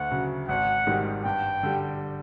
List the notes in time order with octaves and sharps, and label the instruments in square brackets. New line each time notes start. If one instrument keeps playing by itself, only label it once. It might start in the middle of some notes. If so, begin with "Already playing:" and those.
Already playing: [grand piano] D2 [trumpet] F#5
[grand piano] C#3 F#3
[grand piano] G#1 [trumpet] F#5
[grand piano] G#2 D#3 G3
[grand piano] G2 [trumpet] G5
[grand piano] D3 G3